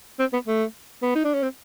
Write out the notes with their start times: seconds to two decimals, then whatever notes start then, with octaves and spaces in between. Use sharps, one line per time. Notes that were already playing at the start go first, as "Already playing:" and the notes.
0.19 C4
0.33 B3
0.47 A3
1.02 B3
1.15 D#4
1.24 D4
1.34 C#4
1.43 C4